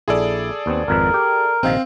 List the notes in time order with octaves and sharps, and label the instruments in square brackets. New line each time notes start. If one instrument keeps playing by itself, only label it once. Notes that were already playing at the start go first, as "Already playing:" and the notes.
[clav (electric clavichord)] A#1 E4 [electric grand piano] G#4 A4 D5
[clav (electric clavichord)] D#2 B3 C4
[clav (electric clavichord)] G#1 F2 B4 [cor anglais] A#4
[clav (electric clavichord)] G4
[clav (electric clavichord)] A#1 C3 D#3 [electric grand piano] C4 F5